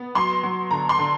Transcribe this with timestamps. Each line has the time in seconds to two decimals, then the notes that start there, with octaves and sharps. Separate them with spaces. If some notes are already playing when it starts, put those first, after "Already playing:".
Already playing: B3
0.15 F#3 C6
0.43 F#3
0.71 D3 A#5
0.89 C6
0.98 D3